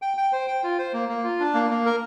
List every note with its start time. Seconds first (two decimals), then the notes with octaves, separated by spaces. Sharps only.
0.02 G5
0.17 G5
0.32 C5
0.48 G5
0.63 F4
0.79 C5
0.93 A#3
1.09 A#3
1.24 F4
1.40 D4
1.54 A#3
1.71 A#3
1.86 A#4